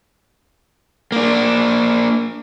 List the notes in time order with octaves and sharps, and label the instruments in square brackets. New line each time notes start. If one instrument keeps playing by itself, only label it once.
[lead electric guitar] A#3 D4